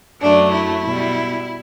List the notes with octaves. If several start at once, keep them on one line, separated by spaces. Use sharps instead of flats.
F#2 F#3 A3 D4
E4
B2 G3